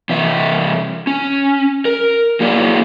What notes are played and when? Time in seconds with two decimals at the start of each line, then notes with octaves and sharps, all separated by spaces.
0.09 C3 E3 E5
1.07 C#4
1.85 A#4
2.40 F#3 A#3 E4 G#4 D5